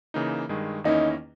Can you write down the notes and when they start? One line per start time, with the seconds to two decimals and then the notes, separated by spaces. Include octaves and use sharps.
0.14 C#3 E3 A#3 D#4
0.49 G2 D#3 G#3
0.84 E2 D#3 A#3 C#4 D#4 E4